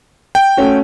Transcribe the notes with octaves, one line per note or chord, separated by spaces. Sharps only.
G5
A3 C#4 F#4